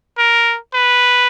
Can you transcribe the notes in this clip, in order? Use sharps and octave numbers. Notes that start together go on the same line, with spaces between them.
A#4
B4